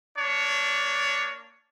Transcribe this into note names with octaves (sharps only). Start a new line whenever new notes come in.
A#3 D4 C#5